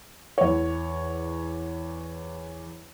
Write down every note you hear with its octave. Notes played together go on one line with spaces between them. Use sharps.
E2 C#5